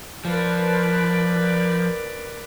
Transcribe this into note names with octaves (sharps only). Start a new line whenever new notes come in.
F3 A#4 B4 D5